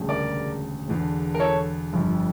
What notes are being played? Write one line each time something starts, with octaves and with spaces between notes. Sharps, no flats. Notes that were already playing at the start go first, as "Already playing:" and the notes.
Already playing: E1 D2 C#3 G3
A#4 D5
E1 E2 D3
A#4
A4 C#5
G1 F2 D3 G3